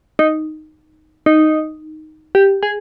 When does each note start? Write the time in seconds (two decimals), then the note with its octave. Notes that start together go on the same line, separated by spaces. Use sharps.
0.19 D#4
1.26 D#4
2.35 G4
2.63 G#4